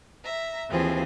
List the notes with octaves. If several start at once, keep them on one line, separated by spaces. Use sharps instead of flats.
E5 A#5
D#2 E3 F3 C4 G#4